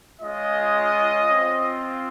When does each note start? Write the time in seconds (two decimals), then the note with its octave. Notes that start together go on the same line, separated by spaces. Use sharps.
0.21 G#3 C#4 F4 D#5
1.30 C4 F4